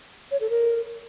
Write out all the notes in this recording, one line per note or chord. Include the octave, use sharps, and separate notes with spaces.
C#5
A4
A#4